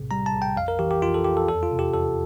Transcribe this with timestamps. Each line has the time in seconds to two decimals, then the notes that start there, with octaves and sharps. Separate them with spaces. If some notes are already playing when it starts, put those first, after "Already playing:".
Already playing: A#1 A2 C3
0.11 G3 A#5
0.26 A5
0.34 A#1
0.42 G5
0.56 F2 F5
0.68 A#4
0.79 E3 G4
0.91 G4
1.02 F2 F4
1.14 A4
1.25 F2 G4
1.37 A4
1.49 E2 A4
1.63 F4
1.71 C3
1.79 G4
1.93 E2 A4